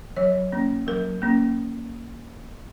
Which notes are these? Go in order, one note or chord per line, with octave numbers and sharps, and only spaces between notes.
F#3 C#5
A#3 C#4
F#3 A#4
A#3 C#4